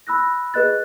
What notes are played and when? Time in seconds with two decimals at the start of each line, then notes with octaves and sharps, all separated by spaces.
0.07 B5 E6 F#6 A#6
0.54 G#4 B4 D#5 F#6 A6